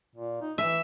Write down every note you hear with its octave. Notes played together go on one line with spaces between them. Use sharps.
A#2
D#4
E3 E5